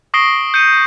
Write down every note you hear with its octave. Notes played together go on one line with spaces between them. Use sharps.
C#6 D#6 A#6 C7 D7 G7
G6 C#7 D#7